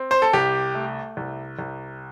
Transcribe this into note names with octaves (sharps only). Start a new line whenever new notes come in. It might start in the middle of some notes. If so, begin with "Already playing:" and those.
Already playing: C4
C5
A4
C2 G4
A3
C2
C2